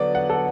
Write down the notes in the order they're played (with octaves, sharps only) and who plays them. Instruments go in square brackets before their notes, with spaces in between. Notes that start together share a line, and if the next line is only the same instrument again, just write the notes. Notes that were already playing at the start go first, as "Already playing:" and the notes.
Already playing: [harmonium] D3 F#3 B3 [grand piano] D5
[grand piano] F#5
A4